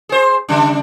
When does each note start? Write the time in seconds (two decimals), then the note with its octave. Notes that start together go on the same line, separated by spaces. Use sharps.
0.09 G#4 C5
0.49 C#3 G3 D4